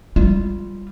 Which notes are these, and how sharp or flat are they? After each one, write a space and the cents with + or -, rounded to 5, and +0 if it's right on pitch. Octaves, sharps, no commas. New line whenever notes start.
G3 +0 F4 -5